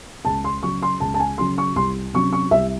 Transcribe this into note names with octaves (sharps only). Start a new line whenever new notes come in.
C#2 A5
C6
C#3 F#3 C#6
C6
C#2 A5
A5
G#5
C#3 F#3 C6
C#6
C2 C6
C3 F#3 C#4 C#6
C#6
C2 E5